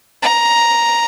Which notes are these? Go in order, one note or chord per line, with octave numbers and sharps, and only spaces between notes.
A#5